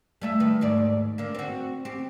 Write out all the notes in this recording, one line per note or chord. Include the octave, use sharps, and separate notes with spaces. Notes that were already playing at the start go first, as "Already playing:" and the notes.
G3 A3 E5
D#3 B4
D#2 G#2 D5
D3 A#3
C4 F#4
C4 G4